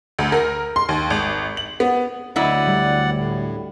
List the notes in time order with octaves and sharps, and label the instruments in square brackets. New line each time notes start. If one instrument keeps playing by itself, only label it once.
[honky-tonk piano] D2
A#4
C6
D#2
G#1
F#7
B3
[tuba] D2 [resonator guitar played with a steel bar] F#3 E4 D#5 [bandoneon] D5 F#5
[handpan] G3
[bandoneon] A2